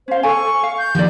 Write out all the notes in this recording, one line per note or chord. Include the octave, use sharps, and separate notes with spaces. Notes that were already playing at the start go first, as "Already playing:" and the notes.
C#4 C5 F5
A4 G#5 C#6
F5
G6
D#3 F3 A#3 G4 D5